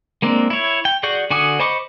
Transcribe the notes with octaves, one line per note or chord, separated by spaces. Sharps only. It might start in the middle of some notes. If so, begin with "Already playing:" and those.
G#3 A#3 C4 D4
E4 C#5
G5
F#4 G#4 D5 C#6 G6
D3 F#4 G#5 D6 D#6
C5 D#5 B5 C#6 D6